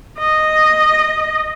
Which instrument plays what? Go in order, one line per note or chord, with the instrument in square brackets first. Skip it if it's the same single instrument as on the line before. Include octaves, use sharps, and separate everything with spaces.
[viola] D#5